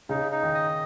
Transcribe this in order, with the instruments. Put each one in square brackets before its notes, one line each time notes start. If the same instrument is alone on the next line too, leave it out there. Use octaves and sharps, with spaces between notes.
[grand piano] C#3 [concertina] D#4
[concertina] D#4
[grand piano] D#3
[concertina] D#5